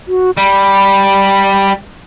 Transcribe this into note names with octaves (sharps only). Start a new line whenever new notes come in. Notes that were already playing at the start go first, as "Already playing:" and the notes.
F#4
G3 B5